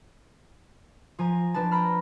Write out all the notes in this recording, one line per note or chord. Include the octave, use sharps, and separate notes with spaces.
F3 G#5 A#5
F3 D4 B4 A5
G5 A#5 B5 F6